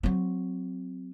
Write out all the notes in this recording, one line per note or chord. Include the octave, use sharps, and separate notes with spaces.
F#3 C4